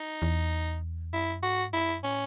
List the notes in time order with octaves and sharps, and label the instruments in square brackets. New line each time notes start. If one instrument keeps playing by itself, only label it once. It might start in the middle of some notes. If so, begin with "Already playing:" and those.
Already playing: [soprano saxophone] D#4
[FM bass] E2
[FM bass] F#2 [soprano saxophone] E4
[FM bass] G#2 [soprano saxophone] F#4
[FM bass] F#2 [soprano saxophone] E4
[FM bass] A2 [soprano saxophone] C#4